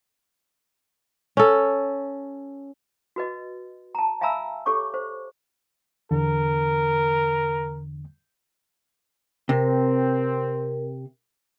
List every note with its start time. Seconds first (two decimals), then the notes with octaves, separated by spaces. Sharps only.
1.37 C#4 A4
3.16 F#4 B4 D#5
3.95 A5 A#5
4.21 E5 F5 G#5 A#5 B5 E6
4.66 G4 A4 C#5 C#6 D6
4.94 C5
6.11 E2 D3 A#4
9.49 C3 C4 A#4